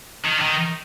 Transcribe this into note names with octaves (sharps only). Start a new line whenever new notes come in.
D#3
D3
D#3